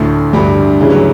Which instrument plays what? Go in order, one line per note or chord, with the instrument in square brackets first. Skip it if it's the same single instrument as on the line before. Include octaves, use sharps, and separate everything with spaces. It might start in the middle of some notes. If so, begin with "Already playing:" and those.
Already playing: [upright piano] D2 [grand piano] A2 A3
[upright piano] D2 [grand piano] G2 G3
[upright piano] C#3 [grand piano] E3
[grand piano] F#3